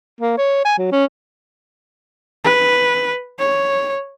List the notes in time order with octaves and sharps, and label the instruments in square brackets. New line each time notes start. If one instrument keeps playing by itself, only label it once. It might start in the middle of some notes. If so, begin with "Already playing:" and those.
[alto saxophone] A#3
C#5
G#5
F#3
C#4
[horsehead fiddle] B4
C#5